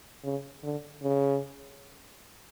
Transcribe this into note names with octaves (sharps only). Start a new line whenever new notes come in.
C#3
D3
C#3